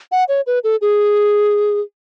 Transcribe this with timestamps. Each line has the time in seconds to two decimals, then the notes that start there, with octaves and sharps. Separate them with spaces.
0.12 F#5
0.29 C#5
0.47 B4
0.64 A4
0.81 G#4